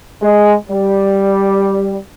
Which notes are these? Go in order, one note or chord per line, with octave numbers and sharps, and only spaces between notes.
G#3
G3